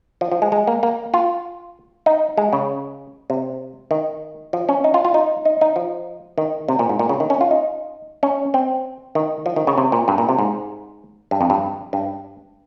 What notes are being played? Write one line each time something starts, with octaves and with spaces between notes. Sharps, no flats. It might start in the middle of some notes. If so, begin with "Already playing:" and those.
F3
F3
G#3
G#3
A#3
A#3
F4
D#4
G#3
C#3
C3
D#3
F3
C#4
D#4
F4
F4
D#4
D#4
D#4
F3
D#3
C3
A#2
G#2
A#2
C#3
D#3
C#4
F4
D#4
C#4
C4
D#3
F3
D#3
C#3
C3
A#2
G2
A#2
C3
G#2
G2
F2
G2
G2